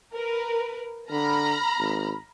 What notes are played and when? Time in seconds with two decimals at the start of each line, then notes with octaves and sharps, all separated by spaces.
0.13 A#4 B4
1.11 D3 A#5 B5 F6
1.79 G#1